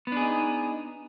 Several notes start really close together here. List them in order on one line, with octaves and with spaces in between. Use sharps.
B3 D4 G#4 D#4